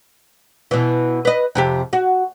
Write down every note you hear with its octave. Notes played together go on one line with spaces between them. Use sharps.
B2 E3
B4 D#5
F2 C3 G4
F#4